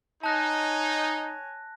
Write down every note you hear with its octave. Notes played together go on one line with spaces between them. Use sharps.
D#4 C#5 G#5 A5 F#6 A#6